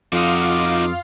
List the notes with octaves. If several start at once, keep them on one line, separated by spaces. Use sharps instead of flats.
F2 D#4 F4 F#4 F5 D6 D#6